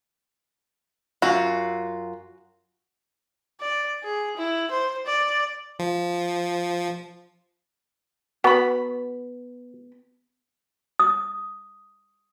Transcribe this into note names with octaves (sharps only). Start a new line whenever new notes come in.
F#2 F4 F#4
D5
G#4
E4
C5
D5
F3
B3 F#4 B5
D#6